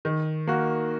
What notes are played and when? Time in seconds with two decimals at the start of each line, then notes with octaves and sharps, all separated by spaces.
0.05 D#3
0.47 A#3 F#4